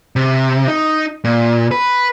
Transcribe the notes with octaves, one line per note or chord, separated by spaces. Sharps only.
C3
D#4
A#2
B4